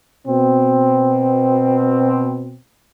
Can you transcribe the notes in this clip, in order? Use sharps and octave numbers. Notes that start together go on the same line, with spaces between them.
B2 C4